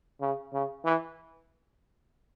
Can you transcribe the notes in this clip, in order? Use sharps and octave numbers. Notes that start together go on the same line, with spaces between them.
C#3
C#3
E3